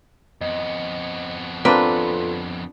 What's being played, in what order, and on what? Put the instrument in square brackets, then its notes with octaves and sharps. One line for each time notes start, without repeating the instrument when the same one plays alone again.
[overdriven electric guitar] F2 B3 [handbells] D#5
[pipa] A#3 B4 [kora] C4 D4 [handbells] F4 A4